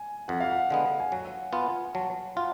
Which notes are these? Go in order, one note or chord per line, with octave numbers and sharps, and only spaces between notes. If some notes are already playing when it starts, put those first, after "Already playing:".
Already playing: G#5
F2 F#5
F5
F#5
D3 G#3 B3
G#5
F#3 F#5
B3 F4 G#5
F#3 A5
F4 F#5